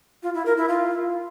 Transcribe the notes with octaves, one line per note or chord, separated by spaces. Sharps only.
F4
E4
A#4
E4
F4